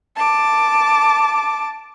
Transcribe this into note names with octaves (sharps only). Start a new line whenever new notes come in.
A5 D6